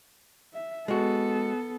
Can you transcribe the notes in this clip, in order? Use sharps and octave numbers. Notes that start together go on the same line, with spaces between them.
E5
G#3 B3 F#4 A4